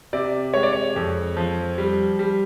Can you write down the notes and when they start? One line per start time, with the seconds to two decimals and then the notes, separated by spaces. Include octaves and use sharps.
0.13 C3 D5
0.54 G#3 C#5
0.63 D5
0.73 C#5
0.96 F2
1.37 F3
1.78 G3
2.19 G3